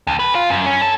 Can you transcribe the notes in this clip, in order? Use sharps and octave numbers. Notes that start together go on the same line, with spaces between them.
D2
B4
F4
F#2
C#4
A4